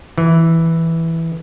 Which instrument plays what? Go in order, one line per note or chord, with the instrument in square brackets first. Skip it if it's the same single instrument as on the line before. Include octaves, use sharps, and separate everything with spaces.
[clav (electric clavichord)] E3